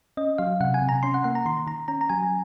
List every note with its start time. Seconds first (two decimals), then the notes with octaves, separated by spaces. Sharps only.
0.17 C#4 D#5
0.38 F#3 F5
0.60 C3 F#5
0.74 G#5
0.82 C3
0.89 A#5
1.03 C#4 C6
1.14 F#5
1.24 A#3 F#5
1.35 A#5
1.46 D#3 C6
1.67 D#3 A#5
1.88 C#4 A#5
2.01 A#5
2.09 F#3 G#5